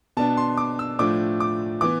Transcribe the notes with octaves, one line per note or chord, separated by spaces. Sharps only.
B2 B3 D4 A5
C6
D6
E6
A2 F3 A3 D4 D6
D6
E3 B3 D6